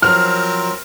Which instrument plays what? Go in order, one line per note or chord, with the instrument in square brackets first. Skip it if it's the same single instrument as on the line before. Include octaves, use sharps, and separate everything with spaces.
[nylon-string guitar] F3 F#3 [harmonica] C4 A#4 [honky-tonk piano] F6